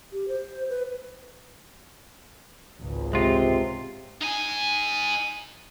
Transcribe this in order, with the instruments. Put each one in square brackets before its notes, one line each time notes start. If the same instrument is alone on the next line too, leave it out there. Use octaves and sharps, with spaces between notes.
[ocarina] G4
C5
B4
[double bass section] G#1 C#2
[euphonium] C3 [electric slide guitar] G#3 F4
[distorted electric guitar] D#4 G#5